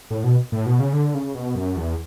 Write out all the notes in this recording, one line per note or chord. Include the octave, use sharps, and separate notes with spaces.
A2
B2
A2
B2
C#3
D3
C#3
B2
F#2
E2